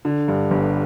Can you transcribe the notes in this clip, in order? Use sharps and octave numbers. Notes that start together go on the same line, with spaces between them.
D3
G2
G1